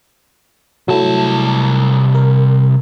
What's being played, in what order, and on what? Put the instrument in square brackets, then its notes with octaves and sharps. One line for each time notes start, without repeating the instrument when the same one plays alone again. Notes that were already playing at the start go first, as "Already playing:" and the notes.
[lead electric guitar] C2 A5 [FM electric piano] F#3 A3 E4
[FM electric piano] A#4